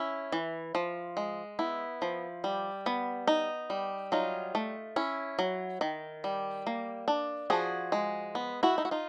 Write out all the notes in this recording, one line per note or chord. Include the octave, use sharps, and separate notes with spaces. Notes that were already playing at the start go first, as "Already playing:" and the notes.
Already playing: C#4 E4
E3
F3
G#3
B3 E4
F3
G3
B3
D#4
G3
F#3 D#4 F4
A3
C#4 E4
F#3
D#3
G3
A#3
D4
F3 F#4 G#4
G#3
B3
E4 F#4
D#4
F#4
D#4 F4